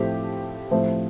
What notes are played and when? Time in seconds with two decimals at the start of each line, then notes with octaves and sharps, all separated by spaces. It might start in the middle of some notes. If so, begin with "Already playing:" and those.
Already playing: A2 F3 A3 C4 G4
0.71 A2 F3 A3 C4